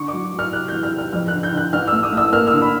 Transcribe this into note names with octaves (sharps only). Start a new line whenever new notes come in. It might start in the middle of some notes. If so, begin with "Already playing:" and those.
Already playing: D3 C#6
D6
F#3
F#3
F6
C3 F#6
E2 G6
F6
C3
F6
F2 F6
D3 F#6
G6
D3 F#6
A1 F6
E6
A3
D#6
A3
E6
A#3 F6
E6
D3
B5